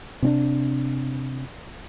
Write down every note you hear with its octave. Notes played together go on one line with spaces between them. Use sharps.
C3 C#4 D4